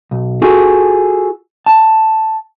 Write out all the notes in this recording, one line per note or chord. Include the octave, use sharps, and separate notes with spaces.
B1
F4 F#4 G#4 A4
A5